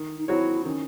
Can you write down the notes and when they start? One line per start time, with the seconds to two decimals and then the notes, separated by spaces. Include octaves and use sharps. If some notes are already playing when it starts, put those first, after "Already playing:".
Already playing: D#3
0.17 D#4
0.28 F#3 C4 E4 F#4 C#5
0.65 D#3 C#4